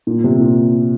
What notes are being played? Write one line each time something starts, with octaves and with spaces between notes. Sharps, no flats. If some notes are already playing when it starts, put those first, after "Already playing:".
A#2
C3
A#2